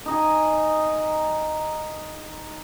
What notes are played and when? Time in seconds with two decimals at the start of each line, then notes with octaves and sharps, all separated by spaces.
0.06 D#4 D#5 G#5